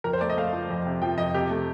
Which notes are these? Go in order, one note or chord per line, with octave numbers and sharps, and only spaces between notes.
F2 A#4
C5
A3 D5
D#5
A3 F5
F3
F2
C3
F3 G5
F2 D#5
C3 G4
A3